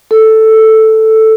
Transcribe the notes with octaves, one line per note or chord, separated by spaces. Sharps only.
A4